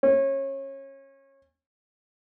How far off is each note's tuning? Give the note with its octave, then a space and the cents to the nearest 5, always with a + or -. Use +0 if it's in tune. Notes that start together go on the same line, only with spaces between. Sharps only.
C#4 -25